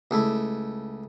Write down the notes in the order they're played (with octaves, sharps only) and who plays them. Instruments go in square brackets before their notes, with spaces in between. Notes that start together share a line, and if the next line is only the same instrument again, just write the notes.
[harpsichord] C#2 A3 E4